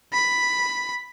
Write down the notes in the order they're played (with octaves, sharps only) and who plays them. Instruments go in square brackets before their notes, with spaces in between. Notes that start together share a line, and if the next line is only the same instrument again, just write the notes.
[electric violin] B5